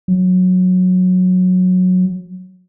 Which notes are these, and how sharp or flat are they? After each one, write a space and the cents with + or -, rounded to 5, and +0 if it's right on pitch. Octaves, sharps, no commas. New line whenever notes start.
F#3 -15